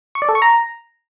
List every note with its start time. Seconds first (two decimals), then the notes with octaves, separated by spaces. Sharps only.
0.15 C#6
0.22 D5
0.29 A4
0.35 C#6
0.42 A#5